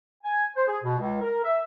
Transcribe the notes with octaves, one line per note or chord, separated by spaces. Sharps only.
G#5
C5
G#4
B2
C#2
A#4
E5